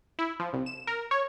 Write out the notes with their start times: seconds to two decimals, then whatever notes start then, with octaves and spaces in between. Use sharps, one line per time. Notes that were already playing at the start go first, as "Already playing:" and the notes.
0.19 E4
0.40 F3
0.53 C2
0.66 E7
0.87 A#4
1.11 C#5